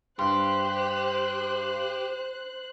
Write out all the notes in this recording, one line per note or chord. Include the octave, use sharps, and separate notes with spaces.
G2 G4 C5 C6 F#6